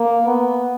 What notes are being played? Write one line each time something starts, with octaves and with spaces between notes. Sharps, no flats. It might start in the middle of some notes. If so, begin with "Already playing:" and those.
Already playing: A#3
B3